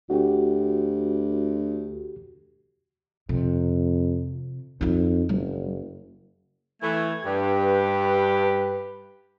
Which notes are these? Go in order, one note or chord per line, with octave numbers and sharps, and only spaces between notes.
D2 F#4 G4
F2 C3
F2 D#4 F4
F#1 F#3
E3 A3 G#6
G2 G4 B4